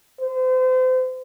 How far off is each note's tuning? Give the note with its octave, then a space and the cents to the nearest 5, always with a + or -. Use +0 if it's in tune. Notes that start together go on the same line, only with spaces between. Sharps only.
C5 -35